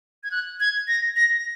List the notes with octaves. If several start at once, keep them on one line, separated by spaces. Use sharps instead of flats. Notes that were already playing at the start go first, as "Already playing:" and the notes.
G#6
F#6
G#6
A#6
A#6